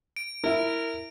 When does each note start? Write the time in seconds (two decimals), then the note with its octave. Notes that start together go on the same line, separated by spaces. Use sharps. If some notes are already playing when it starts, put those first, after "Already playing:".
0.16 D7
0.44 E4 A#4 E5